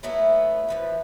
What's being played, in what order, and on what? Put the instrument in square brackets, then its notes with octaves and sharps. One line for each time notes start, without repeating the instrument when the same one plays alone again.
[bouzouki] F#3 A3 B3 E4
E3 F3 B4